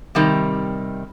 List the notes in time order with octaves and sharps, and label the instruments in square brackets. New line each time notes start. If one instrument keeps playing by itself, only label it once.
[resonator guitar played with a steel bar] C3 D#3 G3